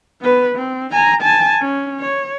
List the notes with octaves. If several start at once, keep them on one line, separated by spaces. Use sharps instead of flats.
B3 B4
C4
G#5 A#5
G#5 A5
C#4
C#5